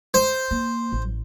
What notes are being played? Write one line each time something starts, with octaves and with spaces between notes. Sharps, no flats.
C5
A#3
A1